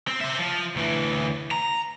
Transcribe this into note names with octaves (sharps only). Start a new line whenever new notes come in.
C4
C5 E5
F3
D2 E3
A#5